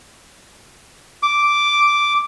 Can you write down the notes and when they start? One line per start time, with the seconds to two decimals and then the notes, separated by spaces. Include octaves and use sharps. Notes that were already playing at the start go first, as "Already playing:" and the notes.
1.23 D6